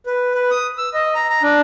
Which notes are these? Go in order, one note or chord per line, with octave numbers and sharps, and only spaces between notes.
B4
B4
D#6
E6
D#5
A#5
A#5
D4